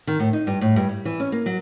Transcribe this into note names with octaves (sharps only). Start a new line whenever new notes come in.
D#3
A2
D#4
G2
A2
G2
G3
E3
C#4
A#3
F#3